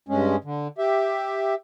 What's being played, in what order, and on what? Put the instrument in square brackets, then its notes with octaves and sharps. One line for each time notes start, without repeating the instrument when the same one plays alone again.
[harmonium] G2 G#3 C#4
D3
G4 E5